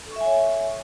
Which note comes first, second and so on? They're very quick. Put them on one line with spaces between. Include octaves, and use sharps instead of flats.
A4 C#6 E5 G#5 C#5